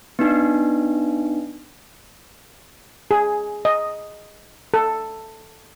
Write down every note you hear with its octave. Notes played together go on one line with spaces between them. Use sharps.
B3 D4 D#4
G#4
D#5
A4